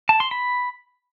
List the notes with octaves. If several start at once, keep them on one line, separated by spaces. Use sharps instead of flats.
A5
C6
B5